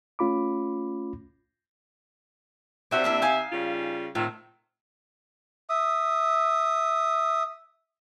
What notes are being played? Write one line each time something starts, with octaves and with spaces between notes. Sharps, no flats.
A3 C#4 F4 B5 D6
C3 D4 F#4 C5 E5
A#3 D4 E4
D#4 F5 G#5
C#3 G3 F4
A2 D#3 C4 F4
E5 D#6